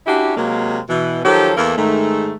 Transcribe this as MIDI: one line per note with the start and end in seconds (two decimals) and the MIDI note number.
0.07 0.36 61
0.07 0.36 62
0.07 0.36 64
0.07 0.36 66
0.07 0.36 67
0.37 0.79 48
0.37 0.79 54
0.37 0.79 56
0.37 0.79 58
0.90 1.22 47
0.90 1.22 52
1.25 1.53 51
1.25 1.53 53
1.25 1.53 54
1.25 1.53 58
1.25 1.53 67
1.25 1.53 69
1.57 1.77 40
1.57 1.77 52
1.57 1.77 58
1.57 1.77 69
1.57 1.77 70
1.78 2.34 44
1.78 2.34 51
1.78 2.34 57